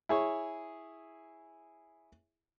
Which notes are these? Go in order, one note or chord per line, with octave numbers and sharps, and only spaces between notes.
E4 G#4 C#5